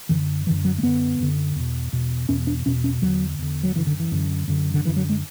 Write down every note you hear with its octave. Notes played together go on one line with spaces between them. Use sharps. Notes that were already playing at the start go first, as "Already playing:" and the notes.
F#2 D3 E3
F#2 D3 E3
F#3
A3
F#2 D3 B3
F#2 D3
E2 B2
E2 B2
E2 B2 C#4
D4
E2 B2 C#4
C#4
E2 D3 F#3
E2 D3
F#3
F#2 D3 E3
D3
E3
F#2 D3
F#2 D3
D3
F#2 D3 E3
F#3
G#3